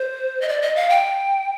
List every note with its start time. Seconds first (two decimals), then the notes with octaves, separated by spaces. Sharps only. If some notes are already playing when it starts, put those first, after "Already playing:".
Already playing: C5
0.41 D#5
0.49 D5
0.62 D#5
0.76 F5
0.90 G5